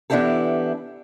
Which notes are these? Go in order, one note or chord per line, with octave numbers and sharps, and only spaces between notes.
E3 B3 D4 E4 G4 A4